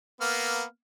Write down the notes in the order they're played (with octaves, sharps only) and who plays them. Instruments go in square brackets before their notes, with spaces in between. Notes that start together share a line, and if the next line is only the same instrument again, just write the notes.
[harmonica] A#3 B3 F6